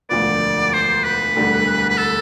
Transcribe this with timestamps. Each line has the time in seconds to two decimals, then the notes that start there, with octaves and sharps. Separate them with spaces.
0.09 E1 D2 D3 F3 B3 D5
0.73 C5
1.04 B4
1.36 E1 D2 D3 G3
1.89 B4
1.98 A4